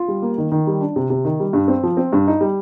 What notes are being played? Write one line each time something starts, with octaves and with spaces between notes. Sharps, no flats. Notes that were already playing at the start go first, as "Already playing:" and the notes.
Already playing: F4
G3
A#3
D#3
D#3
G3
D4
C3
C3
D#3
G3
G2
C4
F3
C4
G2
D#4
G3